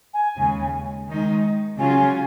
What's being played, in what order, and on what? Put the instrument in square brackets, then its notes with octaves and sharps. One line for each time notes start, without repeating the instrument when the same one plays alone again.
[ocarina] G#5
[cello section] D#2 C#3 G#3
D#3 G#3 D#4
[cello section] C#3 F#3 C#4 F4 [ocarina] G#5